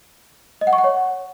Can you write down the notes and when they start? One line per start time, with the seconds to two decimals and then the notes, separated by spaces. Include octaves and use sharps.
0.61 D#5
0.67 F#5
0.73 C#6
0.78 F#5
0.84 C#5